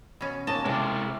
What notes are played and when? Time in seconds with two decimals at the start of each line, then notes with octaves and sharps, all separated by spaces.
0.21 B2 C#4
0.47 D#2 A#3 C#4 D#5 A5
0.65 C3 G#3 E4 A5 C6 D6